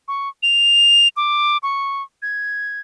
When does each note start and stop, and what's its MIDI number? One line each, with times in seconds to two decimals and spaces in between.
0.08 0.29 85
0.43 1.08 101
1.17 1.57 86
1.63 2.02 85
2.22 2.80 92